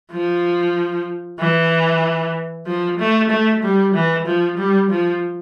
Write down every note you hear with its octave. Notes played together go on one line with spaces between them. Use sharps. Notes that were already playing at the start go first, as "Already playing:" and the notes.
F3
E3
F3
A3
A3
G3
E3
F3
G3
F3